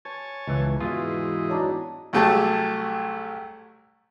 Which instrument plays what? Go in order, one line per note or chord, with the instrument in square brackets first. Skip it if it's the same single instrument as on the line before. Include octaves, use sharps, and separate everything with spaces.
[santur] C5 [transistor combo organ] C#5 G#5 A5
[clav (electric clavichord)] C#2 E3 [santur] G#4
[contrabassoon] E2 [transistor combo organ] G#2 E3 D#5 [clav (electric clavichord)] F4 [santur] F#4 F5
[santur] F#3 D4 D#4
[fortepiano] C2 F#3 A3 G4 G#4 A5